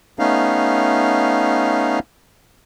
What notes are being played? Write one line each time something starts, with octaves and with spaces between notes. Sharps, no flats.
A3 B3 C#4 D#4 F5